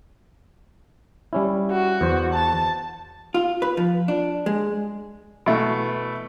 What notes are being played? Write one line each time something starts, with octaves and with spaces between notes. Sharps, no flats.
G3 C#4 E4
F#4
E2 C5
A5
F4
B4
F3
D4
G#3
B2 E3 A3